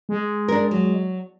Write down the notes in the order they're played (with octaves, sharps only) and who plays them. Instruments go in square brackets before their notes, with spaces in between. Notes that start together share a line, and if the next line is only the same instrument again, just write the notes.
[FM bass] G#3
[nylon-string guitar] D4 A#4
F#3